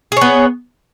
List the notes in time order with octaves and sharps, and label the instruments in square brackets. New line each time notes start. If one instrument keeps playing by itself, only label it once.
[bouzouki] G#4
C#5
B3